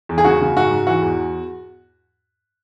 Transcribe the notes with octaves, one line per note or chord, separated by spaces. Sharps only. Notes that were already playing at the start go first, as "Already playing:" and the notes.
E2
G#4
C#3 F#4
C#3
G#2 F#4
G#2
E3 F#4
E2